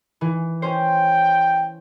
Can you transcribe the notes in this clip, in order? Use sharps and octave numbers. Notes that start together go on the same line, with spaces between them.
E3
C#4 C5 G5